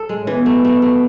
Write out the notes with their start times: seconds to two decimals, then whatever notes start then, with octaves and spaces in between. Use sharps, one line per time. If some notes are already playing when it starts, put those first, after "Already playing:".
Already playing: A4
0.09 G#3
0.19 A2
0.27 B2 E3
0.46 A3
0.65 A3
0.82 A3